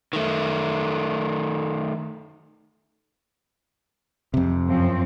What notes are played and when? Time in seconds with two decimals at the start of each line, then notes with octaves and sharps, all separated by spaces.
0.13 D#3 A3
4.34 F2 C3
4.67 F#2 F3 C4